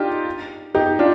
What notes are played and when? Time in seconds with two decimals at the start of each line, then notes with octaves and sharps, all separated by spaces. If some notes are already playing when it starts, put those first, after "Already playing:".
Already playing: D4 D#4 F4 G4
0.75 D#4 G4
0.99 D4 F4